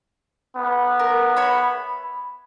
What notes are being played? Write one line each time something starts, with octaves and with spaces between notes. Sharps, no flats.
B3
A#4
C#5 E5 B5